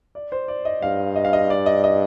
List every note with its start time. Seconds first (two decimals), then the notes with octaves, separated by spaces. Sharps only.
0.15 D5
0.32 C5
0.48 D5
0.65 D#5
0.82 G2 F5
1.16 D#5
1.25 F5
1.33 D#5
1.50 D5
1.66 D#5
1.84 D#5